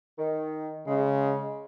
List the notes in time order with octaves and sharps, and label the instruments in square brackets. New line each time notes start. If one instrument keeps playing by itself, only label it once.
[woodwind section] D#3
[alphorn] C#3 [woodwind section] G#3